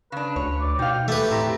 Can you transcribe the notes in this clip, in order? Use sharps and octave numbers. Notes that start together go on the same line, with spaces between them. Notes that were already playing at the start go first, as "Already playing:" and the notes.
C#3 D4 B4
D2 C#5
D5
B2 D#4 F5 G5
A3 G4 B4
A2 C4 G4 A#5